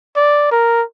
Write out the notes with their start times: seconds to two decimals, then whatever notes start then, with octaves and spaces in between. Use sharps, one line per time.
0.16 D5
0.51 A#4